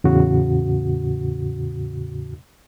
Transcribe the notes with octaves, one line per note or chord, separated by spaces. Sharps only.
E2 A2 C#3 F#4